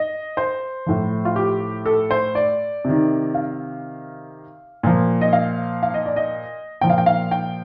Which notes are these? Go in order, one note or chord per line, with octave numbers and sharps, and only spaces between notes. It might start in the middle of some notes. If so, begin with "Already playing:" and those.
Already playing: D#5
C5
A2 F3
F4
G4
A4
C5
D5
C3 D#3
F5
A#2 F3
D#5
F5
F5
D#5
D5
D#5
A#2 F3 G5
F5
G5
F5
G5